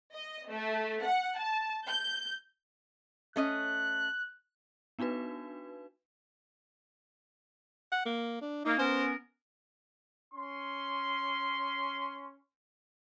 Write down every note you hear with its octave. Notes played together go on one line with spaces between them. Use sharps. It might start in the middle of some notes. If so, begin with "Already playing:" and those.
D#5
A3
F#5
A5
G6
A3 C#4 D#5 F#6
B3 D4 D#4 F#4 B4
F#5
A#3
D4
A#3 D#4
B3 C#4 A#4 C5
C#4 C6